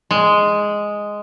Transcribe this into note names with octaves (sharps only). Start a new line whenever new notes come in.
G#3